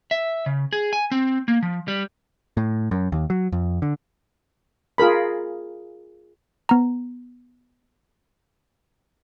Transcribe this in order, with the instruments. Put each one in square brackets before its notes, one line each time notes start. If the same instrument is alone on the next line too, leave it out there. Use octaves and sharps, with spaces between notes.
[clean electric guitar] E5
C#3
G#4
G#5
C4
A#3
F3
G3
[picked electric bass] A2
F#2
D#2
F#3
F2
D3
[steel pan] F4 G#4 A#4 B5
[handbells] B3 A#5